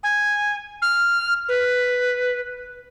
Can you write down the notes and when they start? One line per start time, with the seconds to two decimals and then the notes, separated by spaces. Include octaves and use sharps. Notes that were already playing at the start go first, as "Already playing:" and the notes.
0.03 G#5
0.82 F6
1.49 B4